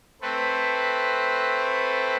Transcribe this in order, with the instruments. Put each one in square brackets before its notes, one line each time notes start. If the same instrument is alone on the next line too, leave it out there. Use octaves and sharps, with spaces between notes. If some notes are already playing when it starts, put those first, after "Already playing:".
[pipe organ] A3 C4 B4